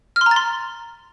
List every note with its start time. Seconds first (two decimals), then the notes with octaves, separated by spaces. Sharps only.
0.16 F6
0.21 C6
0.26 A#5
0.31 A6
0.36 C6